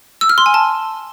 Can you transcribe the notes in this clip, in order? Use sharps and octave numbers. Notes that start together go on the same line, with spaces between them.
E6
F6
C6
G#5
A5